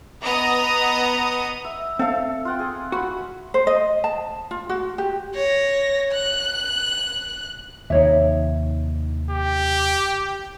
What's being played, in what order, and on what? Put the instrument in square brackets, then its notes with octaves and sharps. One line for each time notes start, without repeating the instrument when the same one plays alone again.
[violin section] B3 D#5 A#5 D#6
[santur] E5
[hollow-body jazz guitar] C4 F5 [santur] A4
[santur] F4 F#5 G5
G#4
[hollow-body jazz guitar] F#4 [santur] F#5 B5
[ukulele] C5
D#5
A5
F4
F#4
G4
[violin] C#5 A#6
F#6
[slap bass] D#2 C3 [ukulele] D#4 C#5 E5
[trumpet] G4